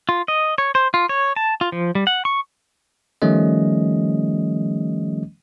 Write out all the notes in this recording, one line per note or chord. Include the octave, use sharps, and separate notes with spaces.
F4
D#5
C#5
C5
F4
C#5
A5
F4
F3
G3
F#5
C#6
D#3 F3 G3 A3 C#4 D#5